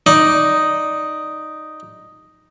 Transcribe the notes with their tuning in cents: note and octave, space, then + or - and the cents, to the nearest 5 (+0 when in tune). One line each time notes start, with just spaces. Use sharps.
D#4 +0 D5 +0